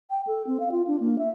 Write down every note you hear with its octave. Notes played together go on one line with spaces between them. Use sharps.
G5
A4
C4
F5
F4
D4
A#3
E5